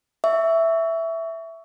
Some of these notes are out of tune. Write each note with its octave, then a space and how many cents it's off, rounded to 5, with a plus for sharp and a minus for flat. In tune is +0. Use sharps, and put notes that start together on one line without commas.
E5 +0 C#6 +25